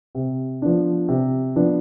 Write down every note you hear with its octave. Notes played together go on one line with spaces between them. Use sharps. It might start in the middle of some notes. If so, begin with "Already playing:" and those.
C3
F3 B3 D4
C3
F3 B3 D4